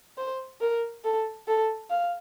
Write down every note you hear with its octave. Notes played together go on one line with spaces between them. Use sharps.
C5
A#4
A4
A4
F5